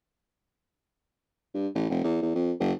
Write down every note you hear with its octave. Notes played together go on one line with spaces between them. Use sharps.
G2
A1
F1
E2
E2
F2
F#1